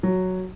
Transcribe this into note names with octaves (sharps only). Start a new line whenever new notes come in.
F#3